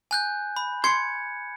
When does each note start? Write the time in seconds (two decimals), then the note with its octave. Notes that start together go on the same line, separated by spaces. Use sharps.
0.11 G#5 F#6 G6
0.56 B5
0.84 C6 G#6 C#7